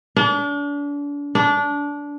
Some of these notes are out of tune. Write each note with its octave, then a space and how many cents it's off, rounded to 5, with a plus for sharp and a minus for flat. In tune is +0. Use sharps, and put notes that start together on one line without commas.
D4 -35
D4 -20